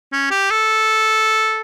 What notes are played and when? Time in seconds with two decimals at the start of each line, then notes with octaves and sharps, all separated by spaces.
0.13 C#4
0.31 G4
0.51 A4